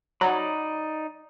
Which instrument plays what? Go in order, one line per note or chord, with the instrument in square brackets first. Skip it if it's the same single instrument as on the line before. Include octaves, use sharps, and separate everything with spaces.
[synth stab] F#3 [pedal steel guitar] D#4 D5 B5